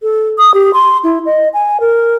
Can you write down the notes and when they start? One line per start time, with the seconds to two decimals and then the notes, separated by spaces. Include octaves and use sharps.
0.03 A4
0.38 D#6
0.54 G4
0.73 C6
1.04 E4
1.26 D#5
1.54 G#5
1.80 A#4